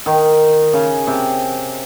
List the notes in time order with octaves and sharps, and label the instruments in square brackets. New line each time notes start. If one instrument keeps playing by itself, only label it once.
[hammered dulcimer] D#3
C#3
C3